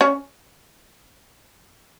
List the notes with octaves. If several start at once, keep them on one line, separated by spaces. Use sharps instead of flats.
C#4 C#5